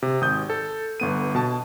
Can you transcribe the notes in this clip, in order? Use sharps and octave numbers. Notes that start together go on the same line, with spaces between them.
C3
G#1 D#6 G6
A4
G1 B3 D#7
B2 A5